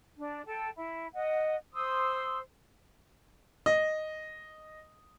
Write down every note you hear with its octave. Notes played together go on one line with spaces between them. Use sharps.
D4
A4 G5
E4
D#5 F#5
C5 C6 D#6 E6
D#5